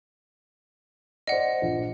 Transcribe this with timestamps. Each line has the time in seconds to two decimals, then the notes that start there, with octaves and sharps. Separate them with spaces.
1.27 C5 D5 D#5 F#5
1.62 A#1